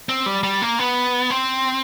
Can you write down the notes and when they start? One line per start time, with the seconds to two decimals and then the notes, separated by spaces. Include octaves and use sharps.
0.09 C4
0.26 G3
0.43 G3
0.62 A#3
0.79 B3
1.30 C4